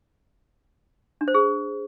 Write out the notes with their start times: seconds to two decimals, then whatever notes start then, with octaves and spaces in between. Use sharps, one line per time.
1.21 D4
1.28 C5
1.34 G#4